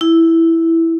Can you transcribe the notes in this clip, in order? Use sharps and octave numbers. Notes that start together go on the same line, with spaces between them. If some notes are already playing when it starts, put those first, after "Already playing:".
E4